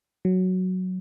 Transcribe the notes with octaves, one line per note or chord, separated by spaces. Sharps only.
F#3